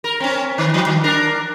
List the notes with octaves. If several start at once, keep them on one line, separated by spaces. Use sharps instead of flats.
A#4
C4 C#4
D#3
F3 G3
D#3
D4 A#4